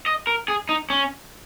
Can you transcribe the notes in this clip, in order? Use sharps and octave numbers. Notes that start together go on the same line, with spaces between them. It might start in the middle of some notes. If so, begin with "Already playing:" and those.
D#5
A#4
G#4
D#4
C#4